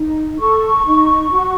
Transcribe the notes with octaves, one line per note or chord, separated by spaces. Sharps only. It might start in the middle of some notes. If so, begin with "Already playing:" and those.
Already playing: D#4
A4 C#6
D#4
F#4